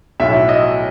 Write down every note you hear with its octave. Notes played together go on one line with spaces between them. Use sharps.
B1 A2 F#3 E5
D#5